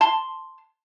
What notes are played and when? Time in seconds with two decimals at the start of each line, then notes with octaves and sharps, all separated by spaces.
0.01 A5 C6